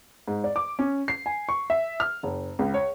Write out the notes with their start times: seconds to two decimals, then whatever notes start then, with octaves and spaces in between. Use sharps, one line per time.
0.28 G#2
0.44 D5
0.56 D6
0.79 C#4
1.08 C7
1.26 G#5
1.49 C#6
1.70 E5
2.00 F6
2.23 F#1
2.59 C#2
2.74 C#5